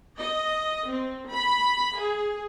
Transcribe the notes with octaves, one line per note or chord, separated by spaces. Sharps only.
D#5
C4
B5
G#4